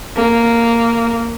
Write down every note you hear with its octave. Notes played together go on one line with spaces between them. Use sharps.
A#3